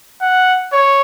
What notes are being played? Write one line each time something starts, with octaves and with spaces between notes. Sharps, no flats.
F#5
C#5